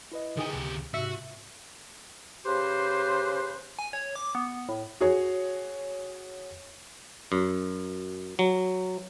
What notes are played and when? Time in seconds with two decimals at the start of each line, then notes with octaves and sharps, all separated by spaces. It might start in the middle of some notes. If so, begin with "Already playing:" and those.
0.12 E4 B4 D#5
0.37 D2 D#3 G4 G#4 D#6
0.53 C#2 C3
0.94 G#2 C3 F#4 E5
2.46 C#3 G4 B4 C5
3.79 G#5
3.93 C#5
4.16 D6
4.35 B3
4.69 A2
5.00 F#4 G#4 C#5
7.32 F#2
8.39 F#3